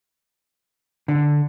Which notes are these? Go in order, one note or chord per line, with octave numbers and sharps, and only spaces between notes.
D3